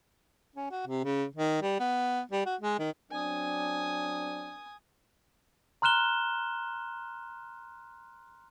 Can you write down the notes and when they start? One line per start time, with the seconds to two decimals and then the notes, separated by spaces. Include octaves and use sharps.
0.55 C#4
0.71 F#4
0.87 C3
1.04 C#3
1.35 D#3
1.62 G3
1.80 B3
2.31 G3
2.46 F#4
2.61 G#3
2.79 D#3
3.11 F#3 C4 D4 G#5 D#6
5.82 A#5 C6 F6 F#6 E7 G7